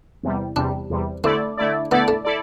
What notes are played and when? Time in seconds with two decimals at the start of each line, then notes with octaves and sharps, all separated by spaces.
0.23 E2 C3 G3
0.56 E2 C3 G3 D4
0.90 E2 C3 G3
1.24 D3 A3 C4 E4 A4 D5
1.57 D3 A3 E4 A4 D5
1.91 D3 A3 B3 E4 A4 D5
2.08 A3
2.25 E4 A4 D5